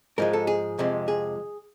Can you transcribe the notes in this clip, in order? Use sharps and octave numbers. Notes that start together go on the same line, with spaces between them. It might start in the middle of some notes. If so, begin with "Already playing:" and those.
G#2 F3 G#3 A#4
A4
G#4
F2 C3 F3 G#3
G#4